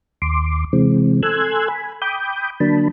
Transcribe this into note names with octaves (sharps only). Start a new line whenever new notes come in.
D#2 C6 D6
C3 E3 G#3 C4
A4 G#5 C6 E6 F#6 G#6
G#5 B5
G5 B5 D6 D#6 G6
D3 F#3 A#3 D4 A5 B5